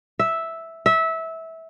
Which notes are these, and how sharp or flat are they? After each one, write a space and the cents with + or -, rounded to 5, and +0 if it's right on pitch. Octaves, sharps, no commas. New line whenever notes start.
E5 -5
E5 -20